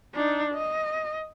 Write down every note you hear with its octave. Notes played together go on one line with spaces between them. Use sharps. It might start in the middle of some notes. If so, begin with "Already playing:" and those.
D4 D#4
D#5